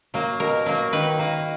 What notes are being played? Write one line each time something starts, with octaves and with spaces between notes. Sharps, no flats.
F#3 A#3
B2 A#4
F#3 A#3
D#3 B4
A#3